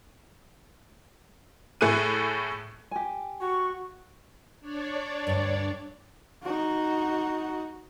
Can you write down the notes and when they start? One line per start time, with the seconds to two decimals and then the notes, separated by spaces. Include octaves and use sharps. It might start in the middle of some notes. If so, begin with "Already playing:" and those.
1.81 A2 A3 G#4 F#6 D#7
2.91 G4 G#5
3.41 F#4 C#6
4.60 D4 C#5 D5
5.27 D2 G2
6.43 D#4 F#4